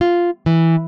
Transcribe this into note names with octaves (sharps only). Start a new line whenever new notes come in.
F4
E3